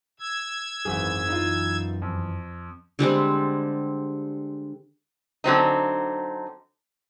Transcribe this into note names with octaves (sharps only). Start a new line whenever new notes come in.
E6 G#6
G#1 F#2 E3 G#4
D#4 F4
F2
D3 G3 G#3 C4
D3 F#3 C4 D#4